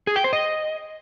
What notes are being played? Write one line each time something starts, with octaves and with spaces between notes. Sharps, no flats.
G#4
G5
C5
D#5